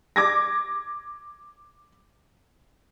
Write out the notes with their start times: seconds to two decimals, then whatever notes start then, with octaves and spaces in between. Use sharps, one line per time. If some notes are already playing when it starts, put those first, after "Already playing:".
0.16 D6 G#6 A#6